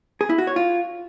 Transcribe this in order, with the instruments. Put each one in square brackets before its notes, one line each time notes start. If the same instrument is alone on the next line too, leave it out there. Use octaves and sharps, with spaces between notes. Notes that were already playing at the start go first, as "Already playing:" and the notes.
[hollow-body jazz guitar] G#4
E4
F#4
C#5
F4